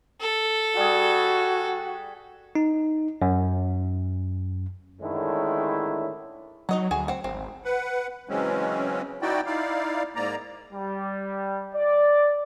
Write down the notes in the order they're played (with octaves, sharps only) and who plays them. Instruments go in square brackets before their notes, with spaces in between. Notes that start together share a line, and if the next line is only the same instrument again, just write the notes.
[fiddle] A4
[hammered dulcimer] G3 G#4 [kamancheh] F#4
[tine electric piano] D#4
F#2
[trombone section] A2 D3 D#3 G#3 C#4 E4
[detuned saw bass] F#3 [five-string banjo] D#4 D#5 F#5
[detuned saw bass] D2 [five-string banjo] F#4 G#4
[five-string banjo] C4 F#5
[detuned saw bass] G#1 [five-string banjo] C4
[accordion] B4 F#5
C#3 E3 F#3 G#3 C4 C#4
D#4 E4 F#4 D5 G5
D#4 E4 D5 F5
G#2 A#3 D5 A#5
[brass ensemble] G3
D5